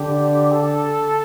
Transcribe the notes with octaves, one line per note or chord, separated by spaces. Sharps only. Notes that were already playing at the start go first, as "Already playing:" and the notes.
Already playing: D3 G4
A4